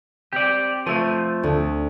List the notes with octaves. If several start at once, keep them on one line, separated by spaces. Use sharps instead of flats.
C4 G4 D5
F3 A3 C5 D#7
D2